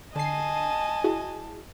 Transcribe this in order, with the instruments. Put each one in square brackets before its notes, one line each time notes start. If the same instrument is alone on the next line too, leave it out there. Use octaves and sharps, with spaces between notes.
[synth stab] D3 C7 [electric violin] D#5 G#5 [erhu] A5
[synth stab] E4 F#4 G#4